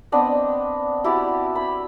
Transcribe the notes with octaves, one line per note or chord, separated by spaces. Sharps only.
B3 C4 D4 D#5
E4 F#4 G4 D5
B5